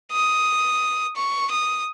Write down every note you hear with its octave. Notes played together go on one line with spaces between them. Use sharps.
D#6
C#6
D#6